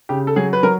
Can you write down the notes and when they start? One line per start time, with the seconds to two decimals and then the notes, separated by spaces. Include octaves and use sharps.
0.09 C#3 G4
0.27 A4
0.36 F#3 G#4
0.53 B4
0.63 F#3 A#4